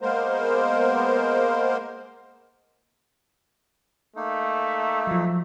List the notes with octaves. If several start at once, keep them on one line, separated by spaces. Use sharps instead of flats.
G#3 A#3 B3 A#4 C5
A3 A#3 D#4
F3 F#3